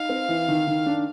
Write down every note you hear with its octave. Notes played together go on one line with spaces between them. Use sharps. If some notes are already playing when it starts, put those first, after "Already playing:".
Already playing: D#4 F5
C4
E3
D#3
D#3
D4